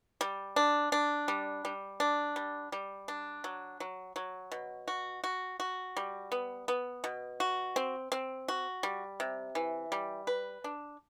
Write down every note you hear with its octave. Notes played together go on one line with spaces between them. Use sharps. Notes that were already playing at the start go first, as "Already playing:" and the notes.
G3
D4
D4
G3
G3
D4
G3
G3
D4
F#3
F#3
F#3
B2
F#4
F#4
F#4
G3
B3
B3
B2
F#4
C4
C4
F#4
G3
C3
E3
G3
B4
D4